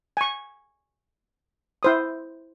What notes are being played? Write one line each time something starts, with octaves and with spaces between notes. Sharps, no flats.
G#5 C#6
E4 C5 D#6